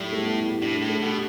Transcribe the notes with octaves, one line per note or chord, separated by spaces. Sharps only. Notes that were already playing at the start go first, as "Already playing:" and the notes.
Already playing: A2 G3 A3
A3
B3
E4
G4
A2 D4
A3
A2
A3
B2 G4